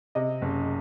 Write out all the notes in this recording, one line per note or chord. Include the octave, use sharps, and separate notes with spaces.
C3 D#5
F#1